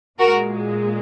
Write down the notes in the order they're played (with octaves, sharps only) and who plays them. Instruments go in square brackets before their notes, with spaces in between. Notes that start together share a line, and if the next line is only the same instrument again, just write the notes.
[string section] A#2 G#3 F#4 A#4